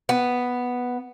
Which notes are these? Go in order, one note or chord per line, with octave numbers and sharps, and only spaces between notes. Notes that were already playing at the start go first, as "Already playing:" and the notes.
B3